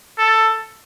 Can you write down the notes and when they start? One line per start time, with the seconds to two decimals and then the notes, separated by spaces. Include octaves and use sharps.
0.18 A4